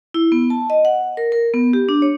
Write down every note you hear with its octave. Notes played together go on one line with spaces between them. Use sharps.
E4
B3
A5
D#5
F#5
A#4
A#4
B3
G4
D4
C#5